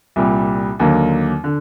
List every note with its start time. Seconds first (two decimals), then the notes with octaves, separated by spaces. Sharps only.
0.16 C2 A#2 G3
0.80 D#2 D3 F#3 A#3
1.44 D3